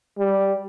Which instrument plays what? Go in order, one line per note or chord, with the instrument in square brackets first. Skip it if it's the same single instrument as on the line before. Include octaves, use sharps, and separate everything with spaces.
[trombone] G3